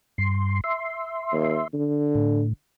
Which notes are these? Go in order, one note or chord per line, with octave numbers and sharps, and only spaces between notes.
G2 C6
E5 C6
D#2
D3
A2